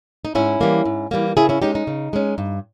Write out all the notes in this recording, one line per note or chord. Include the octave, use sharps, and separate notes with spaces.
D#4
G#2 C#4 E4
E3 G3 A#3
G#2
E3 G3 A#3
C#3 E4 G#4
C#4 E4
G#3 C#4 D#4 G4
D#4
C#3
G#3 C#4
G2